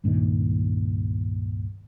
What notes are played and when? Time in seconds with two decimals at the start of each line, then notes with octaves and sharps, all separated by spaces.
0.04 C#2 G2 A#2 D#3